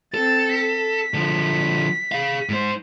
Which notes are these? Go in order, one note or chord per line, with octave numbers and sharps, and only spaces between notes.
C4 A4 A6
B6
D3 F3
G#4 F5
G#2 C5